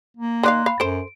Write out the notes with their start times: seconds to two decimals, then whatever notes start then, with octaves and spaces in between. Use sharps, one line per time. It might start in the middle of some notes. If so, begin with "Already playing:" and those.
0.17 A#3
0.43 D#3 D5 F5 C6 F#6
0.66 F5 B5
0.80 F#2 A4 C5 D7